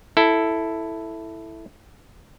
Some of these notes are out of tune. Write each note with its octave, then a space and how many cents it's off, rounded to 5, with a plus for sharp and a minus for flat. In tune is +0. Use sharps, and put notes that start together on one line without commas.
E4 +0 A4 +0